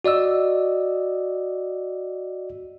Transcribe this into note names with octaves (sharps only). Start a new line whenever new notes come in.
F#4 D5 D#5 E6